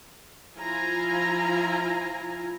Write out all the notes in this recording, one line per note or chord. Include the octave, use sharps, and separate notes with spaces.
F3 E4 F4 G#5 A#5